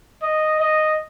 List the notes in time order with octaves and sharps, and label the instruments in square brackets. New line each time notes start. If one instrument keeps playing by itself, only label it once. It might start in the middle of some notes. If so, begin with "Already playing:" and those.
[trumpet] D#5
D#5